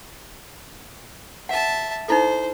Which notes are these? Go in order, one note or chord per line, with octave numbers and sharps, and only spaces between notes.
E5 F#5 A5
D#4 E4 A4 C5